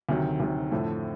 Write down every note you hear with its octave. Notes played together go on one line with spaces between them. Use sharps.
D2 C3 D#3 F#3
D2 C3 D#3 F#3
F2 A2 D3 F3 A3